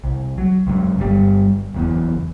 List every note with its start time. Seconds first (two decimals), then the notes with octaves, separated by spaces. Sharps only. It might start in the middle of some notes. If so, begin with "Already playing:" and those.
0.04 C2
0.38 F#3
0.67 C#2 F#2
0.99 G1 G3
1.75 F#1 E2